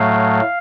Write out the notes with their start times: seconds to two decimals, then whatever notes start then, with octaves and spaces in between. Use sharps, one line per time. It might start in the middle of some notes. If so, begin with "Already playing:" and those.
Already playing: A2 F#3 A3 F5